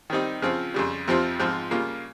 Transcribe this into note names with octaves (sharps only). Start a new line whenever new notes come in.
D#3 G3 C4 D#4
C#3 F3 C4 F4
F2 C#3 G3
F2 C3 F3 C4 F4
G#2 F3 C4 F4
C#3 G3 A#3 F4